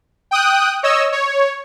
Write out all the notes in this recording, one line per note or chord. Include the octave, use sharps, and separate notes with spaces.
G5 D#6 F#6
C#5 D#5 E6
C#5